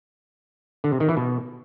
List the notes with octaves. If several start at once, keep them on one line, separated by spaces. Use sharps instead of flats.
D3
C3
D#3
E3
B2